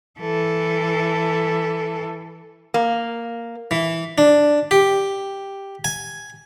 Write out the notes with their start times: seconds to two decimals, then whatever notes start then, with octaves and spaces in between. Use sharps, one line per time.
0.20 E3 A4
2.74 A#3
3.71 E3
4.18 D4
4.71 G4
5.84 G#5